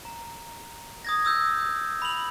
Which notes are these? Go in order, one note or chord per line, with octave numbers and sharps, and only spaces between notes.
A#5
D#6 G#6 A#6
D#6 E6 G6
B5 F#7